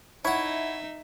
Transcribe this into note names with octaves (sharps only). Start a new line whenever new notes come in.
D#4 E4 C#5 E5 F#5